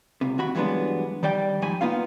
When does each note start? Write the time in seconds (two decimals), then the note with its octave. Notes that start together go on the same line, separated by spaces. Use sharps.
0.21 C#2 C3
0.38 D#2 F#4 B5
0.55 G2 E3 F#3 G#3 B3 D4
1.23 D#3 G3 D5 G5
1.62 G#2 F3 G#5 B5
1.81 A#3 B3 D#4 F4 F5